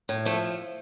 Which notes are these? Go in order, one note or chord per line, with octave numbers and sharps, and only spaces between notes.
A2
F3 A3